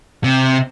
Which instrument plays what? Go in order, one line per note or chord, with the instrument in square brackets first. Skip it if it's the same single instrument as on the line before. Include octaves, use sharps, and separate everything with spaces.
[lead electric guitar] C3